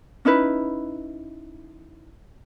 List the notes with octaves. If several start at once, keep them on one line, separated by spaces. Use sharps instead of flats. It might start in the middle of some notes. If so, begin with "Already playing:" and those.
C#4 D#4 E4 B4